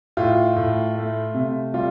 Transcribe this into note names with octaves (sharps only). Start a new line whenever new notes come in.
A2 F4
A2
A3
C3
G3 F4